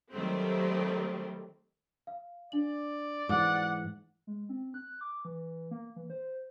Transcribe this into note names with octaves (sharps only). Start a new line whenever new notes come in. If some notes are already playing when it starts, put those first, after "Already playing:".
D#3 F#3 G3 A3 C4
F5
D4 D5 F#7
G#2 E3 F#5 D6
G#3
C4
F#6
D6
E3
A#3
E3
C5